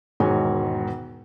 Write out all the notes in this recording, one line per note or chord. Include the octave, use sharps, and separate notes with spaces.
E1 G#2 D#3 F#4 C#5 G#5